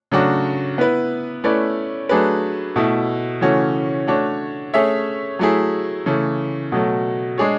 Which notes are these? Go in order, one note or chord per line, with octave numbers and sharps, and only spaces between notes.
C#3 F#3 A3 D4 F#4
B3 E4 B4
A3 C#4 E4 B4 D5
F#3 A3 D4 G#4 B4
B2 A3 E4
C#3 E3 A3 C#4 F#4
A3 D4 F#4 C#5
A3 C#4 G#4 C#5 E5
F#3 A3 E4 G#4
C#3 E3 A3
B2 F#3 A3
G#3 D4 G#4 C#5